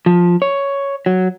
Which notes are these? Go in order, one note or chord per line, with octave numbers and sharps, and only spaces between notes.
F3
C#5
F#3